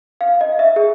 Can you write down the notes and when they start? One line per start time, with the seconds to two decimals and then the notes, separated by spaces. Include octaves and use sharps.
0.21 F5
0.41 D#5
0.59 E5
0.76 G#4